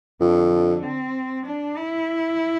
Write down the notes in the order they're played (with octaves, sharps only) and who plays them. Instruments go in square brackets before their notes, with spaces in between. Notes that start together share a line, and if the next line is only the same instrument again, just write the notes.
[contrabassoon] F2 [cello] D3
[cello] D3
C4
D4
E4